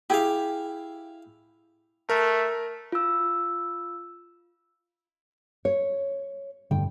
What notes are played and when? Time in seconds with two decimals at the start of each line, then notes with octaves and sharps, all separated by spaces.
0.10 E4 G4 G#4 F5
2.09 A3 A#4
2.92 F4 E6
5.65 C#5
6.71 F1 G2 D3 G5